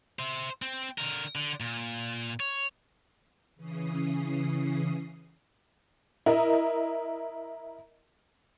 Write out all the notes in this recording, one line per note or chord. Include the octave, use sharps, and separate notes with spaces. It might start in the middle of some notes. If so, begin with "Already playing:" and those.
C5 E5
C4
D3 A#4
D3
A#2
C#5
C#3 E3 C#4 D#6 C7
E4 A#4 D#5